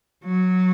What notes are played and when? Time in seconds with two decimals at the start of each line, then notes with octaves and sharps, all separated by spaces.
0.25 F#3